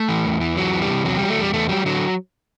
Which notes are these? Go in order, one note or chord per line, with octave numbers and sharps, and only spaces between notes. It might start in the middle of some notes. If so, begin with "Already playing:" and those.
Already playing: A3
E3
E2
E3
E2 F#3
E3
G3
C3
E2 F#3
F#3 G3
A3
E2 G3
E2 A3
F#3 G3
D3 F#3